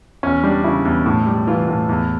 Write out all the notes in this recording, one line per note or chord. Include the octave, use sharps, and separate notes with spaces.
E2 C#4
G3 D4
C#3 E4
E2
A2
G3
E3 F4
A2
E2